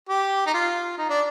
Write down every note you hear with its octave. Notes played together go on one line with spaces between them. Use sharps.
G4
D#4
F4
D#4
D4